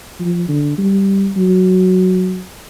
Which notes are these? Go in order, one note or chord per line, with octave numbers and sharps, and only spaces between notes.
F3
D3
G3
F#3